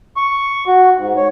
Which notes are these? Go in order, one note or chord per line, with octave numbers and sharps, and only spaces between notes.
C#6
F#4
G#2
C#5